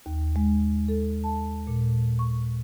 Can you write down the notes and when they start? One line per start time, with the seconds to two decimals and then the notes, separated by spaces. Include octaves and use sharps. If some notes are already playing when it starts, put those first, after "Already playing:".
0.06 D#2
0.36 G#3
0.88 A4
1.24 A5
1.67 A#2
2.19 C#6